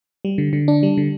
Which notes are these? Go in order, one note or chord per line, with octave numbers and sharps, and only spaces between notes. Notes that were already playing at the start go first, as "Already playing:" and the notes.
G3
D3
D3
D4
G3
D3